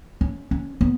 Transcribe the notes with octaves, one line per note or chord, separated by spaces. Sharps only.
C#4
C#4
B3